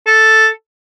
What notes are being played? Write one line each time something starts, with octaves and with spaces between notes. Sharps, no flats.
A4